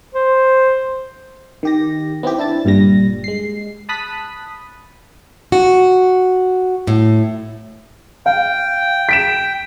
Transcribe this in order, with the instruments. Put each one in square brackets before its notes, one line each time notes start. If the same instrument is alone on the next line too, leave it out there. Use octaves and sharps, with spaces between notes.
[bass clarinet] C5
[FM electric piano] D#3 G4 A#6
B3 C4 E4 G4
D4 E4 A5 A6
G1 G2 A#2 G3 A#6
G#3 C7
A5 B5 D#6 F#6 B6
[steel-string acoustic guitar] F#4
A2
[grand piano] F5 [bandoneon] G5
[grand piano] B6 D7 E7